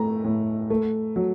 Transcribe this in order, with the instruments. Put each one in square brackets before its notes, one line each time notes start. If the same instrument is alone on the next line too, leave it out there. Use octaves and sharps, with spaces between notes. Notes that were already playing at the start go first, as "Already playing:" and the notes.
Already playing: [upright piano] A2 A3 A#5
A2
A3
F#3